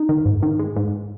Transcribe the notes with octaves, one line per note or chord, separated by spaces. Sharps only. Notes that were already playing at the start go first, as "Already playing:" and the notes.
Already playing: D#4
D#3
G#2
D#3
G#3
G#2